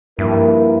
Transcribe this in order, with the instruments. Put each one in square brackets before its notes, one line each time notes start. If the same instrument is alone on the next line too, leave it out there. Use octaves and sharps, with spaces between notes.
[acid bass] G2 [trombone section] F3 A#3 E4 A#4